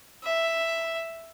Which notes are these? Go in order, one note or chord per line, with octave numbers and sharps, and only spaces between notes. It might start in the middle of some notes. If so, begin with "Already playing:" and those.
E5